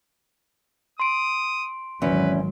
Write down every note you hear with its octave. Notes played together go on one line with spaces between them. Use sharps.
C6 D#6 D7
G#1 E2 D#3 F#3 C#4 B4